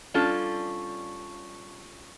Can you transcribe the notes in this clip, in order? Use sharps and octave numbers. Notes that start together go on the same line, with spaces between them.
G3 C#4 D4 F4 A4